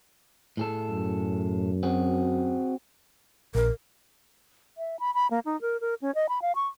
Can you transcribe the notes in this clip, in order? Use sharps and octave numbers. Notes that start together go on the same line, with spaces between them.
A2 G#4 A4
F#2
C4 F#4 G#4
A#1 A#4
E5
B5
B5
A#3
D#4
A#4
A#4
C#4
D#5
B5
F5
C#6